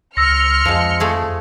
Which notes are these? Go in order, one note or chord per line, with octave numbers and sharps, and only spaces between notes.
C#2 C6 E6 F6 A#6 C#7
F2 F3 G#3
F3 A3 G#4